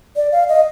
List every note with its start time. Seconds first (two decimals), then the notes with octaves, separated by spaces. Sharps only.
0.16 D5
0.32 F5
0.49 D#5